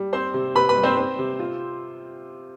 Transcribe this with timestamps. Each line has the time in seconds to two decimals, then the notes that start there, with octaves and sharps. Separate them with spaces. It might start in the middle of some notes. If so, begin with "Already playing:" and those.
Already playing: G3
0.13 C4 C5 C6
0.34 C3
0.55 C3 B4 B5
0.69 B4 B5
0.77 G3
0.83 C4 C5
0.97 C4
1.19 C3
1.40 F4